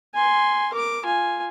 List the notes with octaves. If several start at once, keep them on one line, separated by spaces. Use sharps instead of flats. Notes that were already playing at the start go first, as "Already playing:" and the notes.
G#5 C6
A#4 D6
F4 G#5